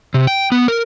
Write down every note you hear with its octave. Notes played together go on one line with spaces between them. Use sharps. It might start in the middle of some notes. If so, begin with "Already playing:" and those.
C3
G5
B3
A#4